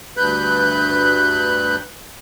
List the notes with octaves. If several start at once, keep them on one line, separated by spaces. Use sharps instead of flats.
D2 G2 B4 B5 F#6 G6